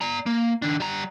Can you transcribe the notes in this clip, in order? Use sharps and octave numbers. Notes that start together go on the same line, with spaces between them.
D5 A#5
A#3
D#3 D4
G3 A#5